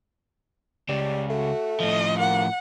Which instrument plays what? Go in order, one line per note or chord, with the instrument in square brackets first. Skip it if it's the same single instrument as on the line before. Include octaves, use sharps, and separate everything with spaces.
[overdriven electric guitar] C#2 C#3 [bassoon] G3
[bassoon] A3 [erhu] F#4
[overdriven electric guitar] A2 F3 [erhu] D#5
[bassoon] A#3 [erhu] F#5